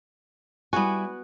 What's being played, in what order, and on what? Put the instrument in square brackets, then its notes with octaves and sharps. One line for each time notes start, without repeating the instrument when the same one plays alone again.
[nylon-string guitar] G3 E4 G#5 [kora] B3 F#4